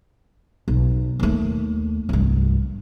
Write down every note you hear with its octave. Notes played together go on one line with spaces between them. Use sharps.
B1
D#2 A3
C2 G2